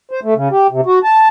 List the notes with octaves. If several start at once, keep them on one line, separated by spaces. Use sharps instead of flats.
C5
A3
C#3
G4
C3
F#4
A5